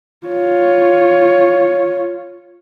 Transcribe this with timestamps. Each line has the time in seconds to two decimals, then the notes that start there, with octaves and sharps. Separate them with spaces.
0.27 F4 C#5